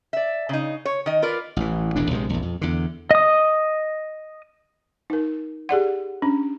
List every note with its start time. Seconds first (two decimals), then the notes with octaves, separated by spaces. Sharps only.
0.13 D5 E5
0.49 C#3 D#4
0.85 C#5
1.06 D#3 D#5
1.22 F4 A#4 B4 D5
1.56 A1 E3
1.96 E1 A1 A#2 D4
2.11 A#1 C3 G#3
2.29 A#1 E2
2.43 F2
2.61 E2 D3
3.11 D#5 D#6
5.10 D#4 A#4
5.69 G4 G#4 D5 F#5
6.22 C#4 D4